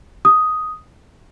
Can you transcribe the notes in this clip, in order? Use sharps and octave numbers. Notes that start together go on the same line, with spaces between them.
D#6